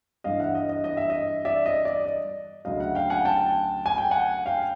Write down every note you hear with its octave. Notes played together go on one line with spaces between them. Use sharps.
G2 E3 D#5 F5
E5 F#5
D#5
D#5
D#5
E5
D#5
D5 E5
D#5
D5
D#5
D2 C#3 F#3 D#5 F5
E5 F#5
F5 G5
F#5 G#5
G5 A5
G#5
G5
F#5 G#5
F5 G5